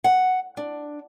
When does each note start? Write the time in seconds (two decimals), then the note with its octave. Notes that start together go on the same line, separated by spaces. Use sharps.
0.04 F#5
0.57 D4